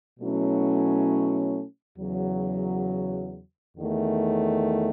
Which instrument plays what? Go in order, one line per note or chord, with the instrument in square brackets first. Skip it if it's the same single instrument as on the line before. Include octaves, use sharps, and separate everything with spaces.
[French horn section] B2 F#3 A3 C#4 E4
E2 C#3 F#3
E2 D#3 A3